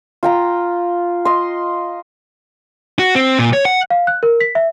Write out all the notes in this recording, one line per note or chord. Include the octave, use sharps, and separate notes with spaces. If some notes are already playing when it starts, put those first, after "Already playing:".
F4 G5 A#5
D#5 C6
F#4
C4
A#2
C#5
F#5
F5
F#6
A#4
B6
E5